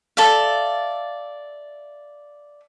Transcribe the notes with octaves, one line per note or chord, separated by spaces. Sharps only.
A4 D5 E5 F5